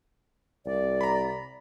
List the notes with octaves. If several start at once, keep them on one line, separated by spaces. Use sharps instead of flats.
C2 D5
A#5 B5